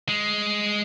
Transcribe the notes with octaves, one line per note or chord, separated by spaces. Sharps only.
G#3